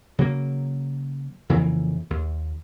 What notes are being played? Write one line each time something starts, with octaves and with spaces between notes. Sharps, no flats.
C#3 F#3 A#3
F2 C#3 E3 A#3
D#2